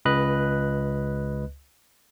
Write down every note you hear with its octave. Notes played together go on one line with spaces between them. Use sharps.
C#2 B4 D#5 F#6